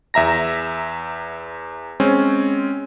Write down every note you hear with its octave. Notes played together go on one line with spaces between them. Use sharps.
E2 E5 A#5 A#6
G#3 C4 C#4